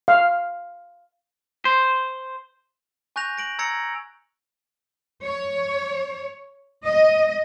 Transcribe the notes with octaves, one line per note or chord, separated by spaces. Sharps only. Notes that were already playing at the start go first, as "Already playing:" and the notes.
F5
C5
G#5 C#6 F#6 G6 A#6 F7
A#6 D7 F#7
A#5 E6 G#6 A#6 C#7
C#5
D#5